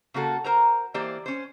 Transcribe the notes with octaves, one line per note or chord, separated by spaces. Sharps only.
C#3 A#3 F#4 A4
A#4 C5 A#5
E3 A#3 G4 C5 D5
C#4 C5